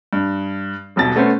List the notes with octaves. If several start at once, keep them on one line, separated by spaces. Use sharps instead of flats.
G2
D#1 B1 B2 A6
A3 B3 C#4 C5